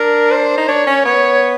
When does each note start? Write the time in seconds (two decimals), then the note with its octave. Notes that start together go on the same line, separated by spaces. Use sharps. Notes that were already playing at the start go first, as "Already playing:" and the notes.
Already playing: D4 A#4
0.31 C5
0.58 D#4
0.68 D4 C#5
0.87 C#4
1.05 B3 C#5